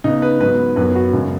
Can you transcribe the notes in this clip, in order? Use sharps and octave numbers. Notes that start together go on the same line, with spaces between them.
C#3 B3 D#4
B4
G#2 F#3 B3 B4
F#2 F#3 B3 B4
F#4
F#2 C#3 G#3